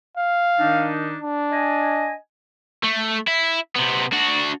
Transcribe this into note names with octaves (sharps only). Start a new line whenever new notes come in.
F5
D#3 D4 D#4
D4
D#5 G#5
A3
E4
C3 B3
D4 F#4